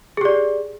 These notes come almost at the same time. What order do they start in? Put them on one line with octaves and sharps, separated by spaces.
G#4 G4 D5